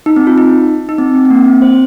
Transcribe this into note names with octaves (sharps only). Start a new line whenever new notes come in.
D#4
C4
F4
D#4
D#4
C4
C4
C4
A#3
C4
C5